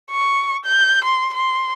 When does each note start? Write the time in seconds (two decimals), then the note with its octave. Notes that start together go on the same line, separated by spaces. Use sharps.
0.11 C#6
0.65 G6
1.04 C6
1.34 C6